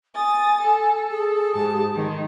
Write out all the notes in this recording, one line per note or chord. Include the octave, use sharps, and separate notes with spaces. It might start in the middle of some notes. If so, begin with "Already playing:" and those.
G#5 D#6 A6
A4
G#4
G#2 G4 A5
D#3 G#3